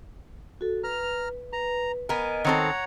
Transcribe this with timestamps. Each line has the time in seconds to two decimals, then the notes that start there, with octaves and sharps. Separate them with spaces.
0.61 F#4 A4
0.84 B4 A#5 F6
1.53 B4 A#5
2.09 B3 A#4 D#5 G#5
2.45 D#3 C4 A4 C#5 F#5 A#5